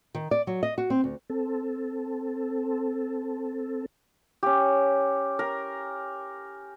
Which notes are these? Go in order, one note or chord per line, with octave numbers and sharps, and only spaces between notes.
D#3
D5
F#3
D#5
F#4
C4
D2
C4 A4
C#4 G4
A#4